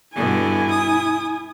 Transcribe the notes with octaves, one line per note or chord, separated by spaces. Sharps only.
G2 B2 D3 E4 G#5
D#6